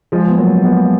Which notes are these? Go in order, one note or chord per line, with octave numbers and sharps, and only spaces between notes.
F3 G#3
B3
F#3 A#3
G#3 B3